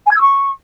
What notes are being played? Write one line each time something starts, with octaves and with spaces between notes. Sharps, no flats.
G#5
G#6
E6
C#6